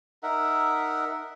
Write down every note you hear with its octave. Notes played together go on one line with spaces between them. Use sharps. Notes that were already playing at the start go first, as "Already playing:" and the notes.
D#4 A#4 E5 F#5